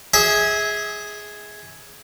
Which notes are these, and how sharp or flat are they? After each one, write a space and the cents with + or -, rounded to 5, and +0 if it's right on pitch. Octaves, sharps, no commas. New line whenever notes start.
G#4 +0 E5 -30